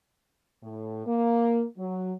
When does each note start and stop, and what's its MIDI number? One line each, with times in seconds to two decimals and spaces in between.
0.63 1.04 45
1.06 1.64 58
1.78 2.13 54